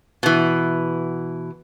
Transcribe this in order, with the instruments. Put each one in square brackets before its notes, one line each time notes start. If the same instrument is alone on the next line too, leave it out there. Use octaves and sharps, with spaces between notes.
[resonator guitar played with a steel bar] B2 E3